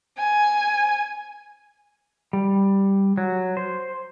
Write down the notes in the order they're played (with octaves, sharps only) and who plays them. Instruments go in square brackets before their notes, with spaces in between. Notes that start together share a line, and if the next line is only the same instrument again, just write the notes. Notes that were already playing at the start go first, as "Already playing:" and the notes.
[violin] G#5
[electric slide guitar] G3
F#3
C5